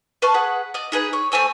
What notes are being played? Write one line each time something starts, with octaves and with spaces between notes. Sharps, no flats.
B4 F5 A5 C#6
G#4 B4 F#5
D5 D#5
D#4 G#4 B4
C#5
A3 C5 G#5 E6